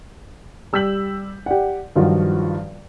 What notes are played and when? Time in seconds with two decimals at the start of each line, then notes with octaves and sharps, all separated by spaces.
0.73 G3 E6 G6 B6 F#7
1.46 G4 D5 F#5
1.96 G2 D#3 F3 F#3 F4 F#4